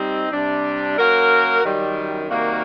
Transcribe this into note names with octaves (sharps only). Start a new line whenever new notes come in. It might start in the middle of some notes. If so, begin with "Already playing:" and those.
Already playing: G3 C4 D#4
C3 G3 D4
F#2 F#3 A#3 F#4 A#4
F#2 D#3 G3
C3 D#3 G3 A#3 F#4